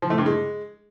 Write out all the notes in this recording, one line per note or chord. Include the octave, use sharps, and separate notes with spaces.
F3
A3
G2
G#3